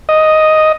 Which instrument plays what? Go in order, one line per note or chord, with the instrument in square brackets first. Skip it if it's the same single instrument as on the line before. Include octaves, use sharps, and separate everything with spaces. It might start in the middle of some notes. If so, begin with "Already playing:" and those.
[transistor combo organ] D#5